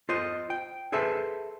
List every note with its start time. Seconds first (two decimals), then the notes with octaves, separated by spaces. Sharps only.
0.09 F4 C5 D#5
0.50 G5
0.92 G#4 A4 B4 C5 E5 A5